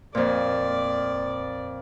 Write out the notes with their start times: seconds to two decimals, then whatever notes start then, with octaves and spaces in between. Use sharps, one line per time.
0.15 F2 A#2 D5